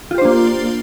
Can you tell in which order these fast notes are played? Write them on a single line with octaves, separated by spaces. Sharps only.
F4 G4 C5 D4 A#3